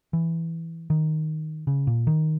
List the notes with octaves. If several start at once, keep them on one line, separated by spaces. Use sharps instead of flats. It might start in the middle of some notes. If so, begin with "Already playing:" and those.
E3
D#3
C#3
A#2
D#3